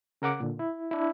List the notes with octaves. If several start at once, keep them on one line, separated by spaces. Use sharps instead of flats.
C#3 A#4 F#5 D6 F#6
A#2 D3
E4
D4 E4